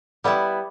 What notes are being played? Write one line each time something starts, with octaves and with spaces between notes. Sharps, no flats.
G3 B3 E4